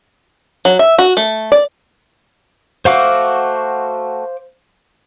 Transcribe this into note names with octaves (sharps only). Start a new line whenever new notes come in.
F#3
E5
F#4
A3
D5
A3 F#4 C5 F5 D6